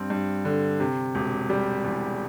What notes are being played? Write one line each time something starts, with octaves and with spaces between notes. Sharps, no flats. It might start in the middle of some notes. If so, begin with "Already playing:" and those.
Already playing: G2 C4
G2
D3
C3
E1
G3
E2